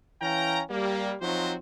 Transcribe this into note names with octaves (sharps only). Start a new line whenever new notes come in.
E3 C#4 F5 G5 A#5
G3 A#3
F3 F#3 C4 D#4 F#4 C5